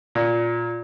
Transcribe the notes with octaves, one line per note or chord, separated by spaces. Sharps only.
A#2